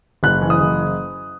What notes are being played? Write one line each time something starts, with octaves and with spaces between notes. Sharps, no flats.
F#1 F#6
E3
D#6
F#1